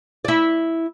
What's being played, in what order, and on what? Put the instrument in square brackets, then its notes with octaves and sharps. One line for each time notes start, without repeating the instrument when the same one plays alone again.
[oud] E4 D5